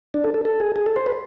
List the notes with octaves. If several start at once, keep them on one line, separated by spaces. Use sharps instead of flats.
D4
A4
A4
A4
G#4
G#4
A4
C5
B4